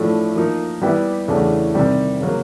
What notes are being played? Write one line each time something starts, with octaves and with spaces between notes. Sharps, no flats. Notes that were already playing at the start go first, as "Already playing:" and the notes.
Already playing: A2 F3 A3 D4
F3 A#3 D#4
G3 B3 E4 G4
E2 C#3 E3 A3 D4
C3 D#3 G3 C4
C#3 F#3 A#3